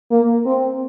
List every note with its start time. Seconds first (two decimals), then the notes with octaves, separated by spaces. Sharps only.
0.11 A#3
0.46 C4